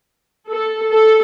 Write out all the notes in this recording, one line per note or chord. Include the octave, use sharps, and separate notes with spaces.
A4
A4